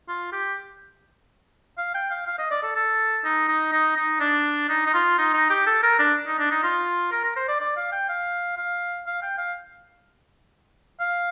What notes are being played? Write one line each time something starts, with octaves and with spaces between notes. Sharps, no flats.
F4
G4
F5
G5
F5
F5
D#5
D5
A4
A4
D#4
D#4
D#4
D#4
D4
D#4
D#4
F4
D#4
D#4
G4
A4
A#4
D4
D#4
D4
D#4
F4
A#4
A#4
C5
D5
D5
F5
G5
F5
F5
F5
G5
F5
F5